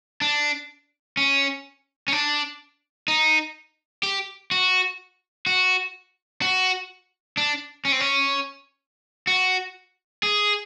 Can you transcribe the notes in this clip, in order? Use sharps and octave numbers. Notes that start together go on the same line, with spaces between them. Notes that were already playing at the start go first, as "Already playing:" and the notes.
D4
C#4
C#4
D4
D#4
G4
F#4
F#4
F#4
D4
C#4
C4
C#4
F#4
G#4